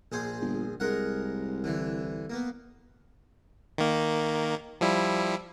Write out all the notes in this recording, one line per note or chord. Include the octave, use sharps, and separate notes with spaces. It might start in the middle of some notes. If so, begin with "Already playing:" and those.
A#1 G#4 C5
G1
C2 G#3 A#4 F#5
D3 E3
A#3 B3
D#3 A#3
F3 G3 E4